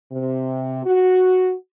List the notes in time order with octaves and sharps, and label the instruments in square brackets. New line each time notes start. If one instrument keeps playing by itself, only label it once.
[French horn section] C3
F#4